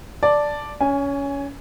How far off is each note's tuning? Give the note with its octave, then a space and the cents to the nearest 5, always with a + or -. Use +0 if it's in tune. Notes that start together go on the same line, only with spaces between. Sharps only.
D5 +0 A5 +0
C#4 +20 G#5 -5